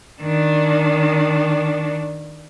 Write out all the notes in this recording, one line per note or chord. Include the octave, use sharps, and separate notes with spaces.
D#3 D4